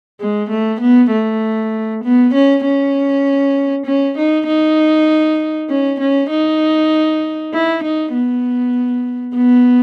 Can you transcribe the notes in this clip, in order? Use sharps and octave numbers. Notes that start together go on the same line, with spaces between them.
G#3
A3
B3
A3
B3
C#4
C#4
C#4
D#4
D#4
C#4
C#4
D#4
E4
D#4
B3
B3